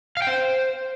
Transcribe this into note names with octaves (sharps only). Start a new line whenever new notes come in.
F5
G5
C5